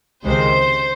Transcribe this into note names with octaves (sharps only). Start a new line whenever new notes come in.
C#2 C3 D#3 G#3 C5